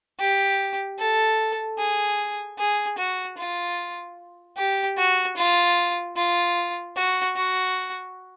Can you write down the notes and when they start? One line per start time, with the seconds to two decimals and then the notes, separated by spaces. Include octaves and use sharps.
0.19 G4
0.98 A4
1.78 G#4
2.59 G#4
2.98 F#4
3.37 F4
4.57 G4
4.97 F#4
5.37 F4
6.16 F4
6.96 F#4
7.36 F#4